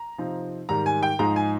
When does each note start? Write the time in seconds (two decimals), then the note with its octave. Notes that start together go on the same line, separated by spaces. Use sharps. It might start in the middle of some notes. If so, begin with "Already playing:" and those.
Already playing: A#5
0.18 C3 F3 C4 D#4
0.69 G#2 D#3 G3 A#5
0.86 G#5
1.03 G5
1.19 G#2 F3 G#3 D#4 A#5
1.36 G#5